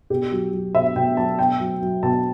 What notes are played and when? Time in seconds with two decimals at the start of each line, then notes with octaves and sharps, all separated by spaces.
0.10 B2 G4
0.32 F#3
0.53 F#3
0.75 B2 E5
0.96 B2 G5
1.17 F#3 A5
1.39 B2 G5
1.60 F#3
1.82 F#3
2.03 B2 A5